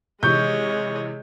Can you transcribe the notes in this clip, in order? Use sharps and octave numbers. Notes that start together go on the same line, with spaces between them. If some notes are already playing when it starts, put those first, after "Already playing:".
C3 D#3 E3 G#3 C#5 D#5 C#6 G6